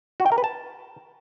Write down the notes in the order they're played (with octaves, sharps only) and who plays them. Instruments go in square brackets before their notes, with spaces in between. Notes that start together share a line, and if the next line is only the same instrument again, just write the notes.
[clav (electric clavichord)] F#4
G5
A#4
B4
A5